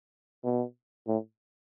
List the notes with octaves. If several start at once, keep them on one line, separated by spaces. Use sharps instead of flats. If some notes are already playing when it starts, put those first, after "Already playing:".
B2
A2